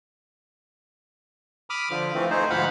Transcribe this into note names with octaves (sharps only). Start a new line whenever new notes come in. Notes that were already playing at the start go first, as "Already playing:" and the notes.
B5 D6 D#6 F6
D3 F3
E3 F3 A3 C4
A3 D#4 G#4 C5
D2 G#2 F3 F5 F#5 B5